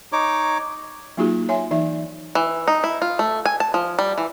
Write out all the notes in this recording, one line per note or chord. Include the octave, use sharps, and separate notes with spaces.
D#4 C#5 D6
F#3 A#3 D#4 F4 F#4 G#4
C#5 E5 G#5 C6
E3 D#4 E5
E3
D#4
E4
F4
A3
G#5
A5
F3
G3
E3